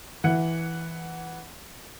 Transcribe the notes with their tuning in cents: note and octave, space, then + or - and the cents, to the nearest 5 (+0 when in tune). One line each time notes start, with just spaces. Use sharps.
E3 +0 F#5 +0